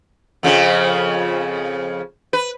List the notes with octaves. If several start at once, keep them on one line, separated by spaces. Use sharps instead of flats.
F2 C#3 F3
B4